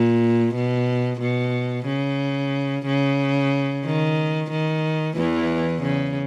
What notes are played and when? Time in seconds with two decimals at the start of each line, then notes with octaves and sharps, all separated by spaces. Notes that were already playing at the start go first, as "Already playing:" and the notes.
Already playing: A#2
0.55 B2
1.21 B2
1.86 C#3
2.86 C#3
3.85 D#3
4.51 D#3
5.17 E2 E3
5.82 C#3